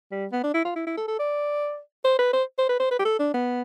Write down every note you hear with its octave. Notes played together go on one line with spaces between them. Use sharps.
G3
B3
D4
E4
F4
E4
E4
A4
A4
D5
C5
B4
C5
C5
B4
C5
B4
G4
A4
D4
B3